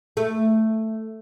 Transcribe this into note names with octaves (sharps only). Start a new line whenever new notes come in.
A3